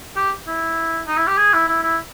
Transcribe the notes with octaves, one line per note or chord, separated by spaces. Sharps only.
G4
E4
D#4
E4
G4
G#4
E4
E4
E4